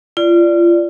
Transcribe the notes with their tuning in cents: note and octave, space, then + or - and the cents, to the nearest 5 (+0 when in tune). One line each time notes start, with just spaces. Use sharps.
F4 -30 D5 +0